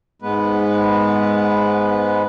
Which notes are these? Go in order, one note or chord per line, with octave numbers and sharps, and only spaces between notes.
G#2 G#3 B3 B4